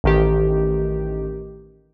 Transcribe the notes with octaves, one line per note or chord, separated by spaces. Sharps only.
A1 D#3 G4